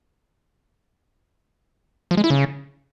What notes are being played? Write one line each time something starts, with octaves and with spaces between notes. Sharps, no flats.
F3
G#3
E4
C#3